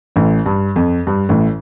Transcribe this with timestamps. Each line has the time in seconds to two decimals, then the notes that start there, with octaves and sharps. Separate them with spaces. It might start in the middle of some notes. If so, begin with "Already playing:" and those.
0.16 A1 A2
0.46 G2
0.76 F2
1.07 G2
1.29 A1 A2